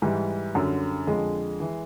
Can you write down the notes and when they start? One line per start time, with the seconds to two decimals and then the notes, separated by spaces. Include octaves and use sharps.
0.02 G#2 E3 G3
0.55 F#2 D3
1.07 F2 D3 G#3
1.60 E3